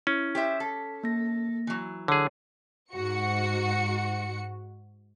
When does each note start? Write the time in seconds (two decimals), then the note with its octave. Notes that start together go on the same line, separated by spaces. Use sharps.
0.07 C#4 E4
0.35 G4 C5 E5 B6
0.60 A4
1.03 A#3 A#6
1.67 E3 F#3
2.08 D3 G#4 C#5
2.92 G#2 F#4 C#7